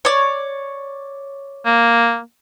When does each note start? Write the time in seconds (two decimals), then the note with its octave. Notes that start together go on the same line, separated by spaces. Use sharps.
0.05 C#5 D5
1.66 A#3